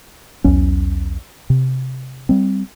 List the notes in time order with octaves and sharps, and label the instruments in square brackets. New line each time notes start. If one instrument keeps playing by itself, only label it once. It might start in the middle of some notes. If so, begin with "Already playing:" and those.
[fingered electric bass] B1 E2 F#3 C#4
C3
G3 C4